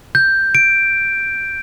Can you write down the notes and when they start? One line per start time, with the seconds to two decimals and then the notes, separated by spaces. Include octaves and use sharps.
0.15 G6
0.55 D7